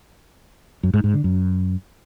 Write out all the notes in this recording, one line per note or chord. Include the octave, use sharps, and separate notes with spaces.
F#2
G#2
G#2
D3
F#2